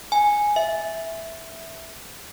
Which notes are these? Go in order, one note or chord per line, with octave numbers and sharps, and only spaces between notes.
G#5
E5